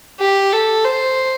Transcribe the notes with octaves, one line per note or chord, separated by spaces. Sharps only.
G4
A4
C5